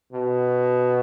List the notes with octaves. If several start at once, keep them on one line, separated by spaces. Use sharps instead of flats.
B2